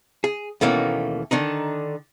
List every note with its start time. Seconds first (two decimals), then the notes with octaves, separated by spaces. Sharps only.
0.24 G#4
0.61 D#2 B2 E3 A3 A#3 C#4
1.31 D3 D#3 D4 D#4